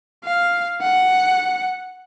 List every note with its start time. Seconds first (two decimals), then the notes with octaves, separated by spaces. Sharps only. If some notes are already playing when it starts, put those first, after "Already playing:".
0.24 F5
0.81 F#5